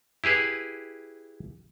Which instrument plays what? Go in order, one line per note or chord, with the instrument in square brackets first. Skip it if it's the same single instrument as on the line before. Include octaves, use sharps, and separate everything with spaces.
[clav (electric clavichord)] E4 G4 G#4 B4